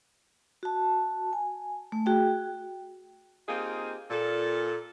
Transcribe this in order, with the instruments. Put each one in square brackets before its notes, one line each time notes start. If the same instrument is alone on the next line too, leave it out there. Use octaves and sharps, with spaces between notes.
[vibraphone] F#4 A5
G#5
A3
F#4 G#4 G5
[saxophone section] A#3 C4 D#4 F4 G4 G#4
A#2 A4